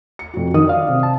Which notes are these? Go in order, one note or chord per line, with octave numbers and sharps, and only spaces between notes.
C#7
F2 F#4
D#3 D#6
D5 F5
C3
A5